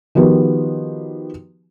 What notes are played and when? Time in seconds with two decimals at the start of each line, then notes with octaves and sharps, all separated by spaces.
0.15 D#3 F3 B3 F#4 G4